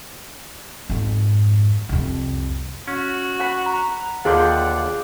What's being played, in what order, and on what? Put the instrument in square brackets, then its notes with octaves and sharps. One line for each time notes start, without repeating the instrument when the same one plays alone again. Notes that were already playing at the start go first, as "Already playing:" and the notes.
[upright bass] F2 G#2
C2 F2
[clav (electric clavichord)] C#4 [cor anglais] F#4
[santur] F#5 B5
[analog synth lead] A#5
[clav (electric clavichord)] D#2 D3 [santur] F4 D5 G5 [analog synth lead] G#4 [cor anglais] F#5